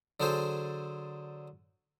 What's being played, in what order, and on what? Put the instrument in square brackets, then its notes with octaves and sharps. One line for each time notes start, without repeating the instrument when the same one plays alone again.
[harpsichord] D3 F#3 G#4 A4 C5